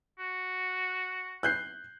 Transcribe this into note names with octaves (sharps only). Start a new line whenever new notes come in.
F#4
F#6 G6 C7